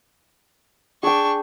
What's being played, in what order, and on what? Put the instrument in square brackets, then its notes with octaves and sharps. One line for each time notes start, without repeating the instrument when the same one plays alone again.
[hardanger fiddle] D4 C#6 [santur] G#4 G5